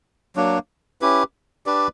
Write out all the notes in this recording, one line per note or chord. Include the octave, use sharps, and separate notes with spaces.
F#3 A#3 D4
C#4 E4 G4 B4
D4 G4 B4 D5